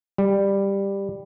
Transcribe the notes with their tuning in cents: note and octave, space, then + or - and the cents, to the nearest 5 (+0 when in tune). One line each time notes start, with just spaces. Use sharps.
G3 +10